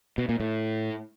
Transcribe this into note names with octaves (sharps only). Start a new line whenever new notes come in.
B2
A#2
A2